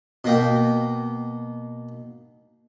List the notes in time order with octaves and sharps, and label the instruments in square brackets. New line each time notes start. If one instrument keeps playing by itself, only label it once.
[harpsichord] B2 A#3 G5